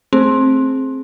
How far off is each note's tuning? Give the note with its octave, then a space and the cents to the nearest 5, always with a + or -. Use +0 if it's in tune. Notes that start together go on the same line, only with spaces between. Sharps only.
A3 +0 C4 +15 G#4 +10